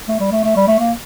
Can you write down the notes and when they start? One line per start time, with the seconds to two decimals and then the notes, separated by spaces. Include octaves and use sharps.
0.08 A3
0.20 G3
0.32 A3
0.44 A3
0.56 G3
0.68 A3
0.80 A#3